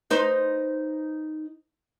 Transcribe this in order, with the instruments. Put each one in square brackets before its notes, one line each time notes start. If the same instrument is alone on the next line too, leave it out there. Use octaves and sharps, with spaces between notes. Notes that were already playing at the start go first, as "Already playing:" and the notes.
[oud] D#4 B4 C5